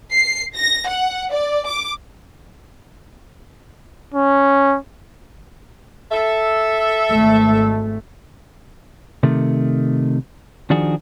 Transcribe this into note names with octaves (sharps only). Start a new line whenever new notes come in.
C7
A#6
F#5
D5
D6
C#4
A4 E5
G#1 A3
C3 D#3 A3
D#3 F3 D4 F#4 G#4